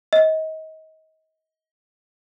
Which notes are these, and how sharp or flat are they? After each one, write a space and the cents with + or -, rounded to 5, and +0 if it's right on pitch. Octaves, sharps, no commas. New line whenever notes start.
D#5 +30